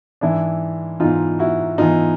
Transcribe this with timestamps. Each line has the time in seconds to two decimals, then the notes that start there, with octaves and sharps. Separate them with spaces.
0.21 G#2 E3 D4 E4
1.00 G#2 E3 D#4 F4
1.39 E4 F#4
1.78 G#2 E3 D#4 F4